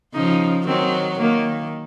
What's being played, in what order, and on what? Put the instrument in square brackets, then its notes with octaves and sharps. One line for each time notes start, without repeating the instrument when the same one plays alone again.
[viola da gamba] C#3 F3 [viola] D#4
[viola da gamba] D#3 F#3 [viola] C4
[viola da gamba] D#3 [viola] A#3